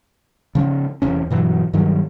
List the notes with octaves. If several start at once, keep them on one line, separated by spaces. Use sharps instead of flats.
C#3 F3 C#4
F1 E2 C3 C#4
G2 B2 E3 F#3
G2 D#3 F#3 G3